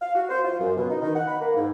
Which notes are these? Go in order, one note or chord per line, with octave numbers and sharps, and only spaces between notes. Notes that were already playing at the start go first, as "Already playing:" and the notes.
F5
F#4
C5
F4
F#2
B2
D#4
D#3
F#5
B5
A#3
G#2